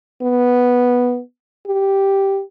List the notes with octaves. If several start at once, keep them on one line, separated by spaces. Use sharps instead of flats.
B3
G4